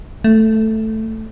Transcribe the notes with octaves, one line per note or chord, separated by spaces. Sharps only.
A3